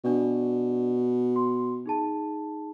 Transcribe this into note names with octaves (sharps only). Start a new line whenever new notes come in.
B2 D4 D5
C6
D#4 G#4 A5